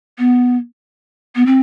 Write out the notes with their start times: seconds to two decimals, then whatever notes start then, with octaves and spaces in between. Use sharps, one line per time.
0.18 B3
1.36 B3
1.46 C4